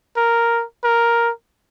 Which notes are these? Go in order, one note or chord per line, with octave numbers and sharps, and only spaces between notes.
A#4
A#4